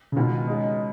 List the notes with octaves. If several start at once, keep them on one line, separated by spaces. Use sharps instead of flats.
C#3
B2 D#3 G#3 B3 F4
C#3 G#3 D#4